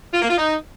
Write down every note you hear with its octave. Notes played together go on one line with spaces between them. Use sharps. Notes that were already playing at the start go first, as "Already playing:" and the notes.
F4
A#3
F4
D#4